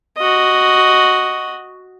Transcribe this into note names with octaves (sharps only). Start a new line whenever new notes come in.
F#4 D#5